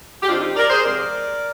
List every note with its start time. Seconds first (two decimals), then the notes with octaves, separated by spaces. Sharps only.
0.23 G4
0.28 D#3 G#3 C4 D4 F4
0.41 D#4 G4
0.55 A#4 D5
0.69 G#4 C5
0.83 C3 F3 G#3 C4 A#4 D5